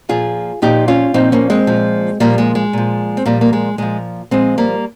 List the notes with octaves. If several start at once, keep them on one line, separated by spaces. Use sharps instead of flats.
A#2 F3 F4 G#4
A#2 F3 D#4 G4
C#4 F4
A#2 F3 C4 D#4
A#3 C#4
G#3 C4
A#2 F3
A#2 F3 G3 A#3
G#3
G#3
A#2 F3
C4
A#2 F3 G3 A#3
A#3
G#3
A#2 F3 G#3
A#2 F3 G#3 C4
G3 A#3